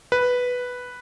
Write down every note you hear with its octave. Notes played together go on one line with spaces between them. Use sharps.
B4